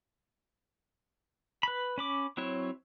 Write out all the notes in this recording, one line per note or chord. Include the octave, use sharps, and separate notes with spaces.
B4 B5
C#4 B5 D6
F#3 C4 E4 C#5